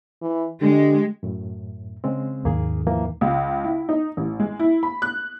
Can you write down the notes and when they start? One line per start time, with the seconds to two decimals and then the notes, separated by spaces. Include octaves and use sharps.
0.22 E3
0.61 D3 G#3 G4
1.23 F#2 A2
2.04 C#3 G#3 C4
2.45 D#2 G#2 A#3 G#4
2.87 E3 F3 A#3
3.21 C#2
3.64 E4
3.89 D#4
4.17 A1
4.40 G#3
4.59 E4
4.83 B5
5.02 F#6